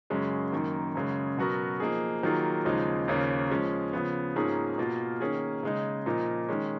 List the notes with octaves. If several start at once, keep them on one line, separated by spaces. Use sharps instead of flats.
F#2 C#3 G#3 C#4 F#4
F#2 D#3 A#3
F#2 C#3 G#3
B2 F#3 B3 F#4 A#4
F3 A#3 D#4 G#4
D#3 F#3 A#3 F4 G#4
D#2 C#3 F3 G#3 D#4
D#2 C#3 F3 A#3 C#4
F3 G#3 C#4
C#3 F3 B3
G#2 F3 A#3 C#4 G#4
B2 A#3 F4 A#4
D#3 A#3 C#4 G#4
C#3 G#3 D#4
A#2 F3 A#3 D#4
D#3 G#3 C#4